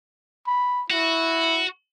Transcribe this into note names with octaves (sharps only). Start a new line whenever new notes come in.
B5
E4 F#4